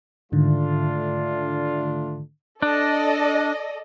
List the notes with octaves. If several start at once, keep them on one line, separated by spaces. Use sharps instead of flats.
G#2 D3 D#3 A3 D4 F4
D4 A4 D5 D#5